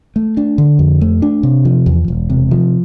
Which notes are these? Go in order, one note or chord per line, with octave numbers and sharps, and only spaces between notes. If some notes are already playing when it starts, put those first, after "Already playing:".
A3
D4
D3
F2
A3
D4
C3
F3
E2
E1
C3
F3